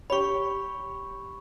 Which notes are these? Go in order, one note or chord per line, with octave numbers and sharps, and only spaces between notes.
G4 C#5 B5 C#6